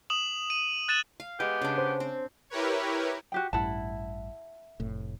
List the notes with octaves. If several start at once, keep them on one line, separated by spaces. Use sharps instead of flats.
D#6 E7 F#7
D#7
F#6 A6 D#7 E7 F#7
F5
G#3 B3 G4
C#3 D4
C5
C4
E4 G4 A#4 B4 C#5
F#4 G4 G5
A1 G2 E4 F#5 A5
F1 A2